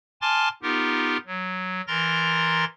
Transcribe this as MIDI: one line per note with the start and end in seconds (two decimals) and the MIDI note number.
0.22 0.49 80
0.22 0.49 81
0.22 0.49 84
0.22 0.49 86
0.22 0.49 89
0.22 0.49 93
0.62 1.17 59
0.62 1.17 63
0.62 1.17 65
0.62 1.17 67
0.62 1.17 70
1.27 1.81 54
1.87 2.65 52
1.87 2.65 70
1.87 2.65 82
1.87 2.65 84
1.87 2.65 93
1.87 2.65 94